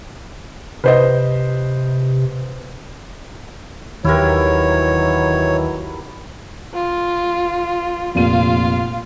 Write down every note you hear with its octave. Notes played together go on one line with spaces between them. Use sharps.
C3 B4 C5 D#5
D#2 D#3 E3 F#3 E4 G4 A#4 C#5
F4
F1 A#2 F4 F5 D#7